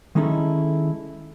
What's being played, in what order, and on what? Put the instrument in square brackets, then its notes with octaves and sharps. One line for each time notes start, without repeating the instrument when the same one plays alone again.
[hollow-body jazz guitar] D#3 G#3 C#4 D#4 E4 A4